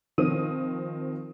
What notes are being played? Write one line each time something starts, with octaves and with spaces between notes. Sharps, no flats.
D#3 F3 C4 D#6 D#7